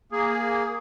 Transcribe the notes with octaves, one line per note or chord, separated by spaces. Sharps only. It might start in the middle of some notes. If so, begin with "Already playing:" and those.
A#3 G#4